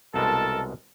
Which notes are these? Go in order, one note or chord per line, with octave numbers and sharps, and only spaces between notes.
C2 B2 G#3 A4 A#4 A5